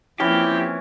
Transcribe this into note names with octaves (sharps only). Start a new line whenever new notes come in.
E3 F3 A#3 C4 C#4 E4 G4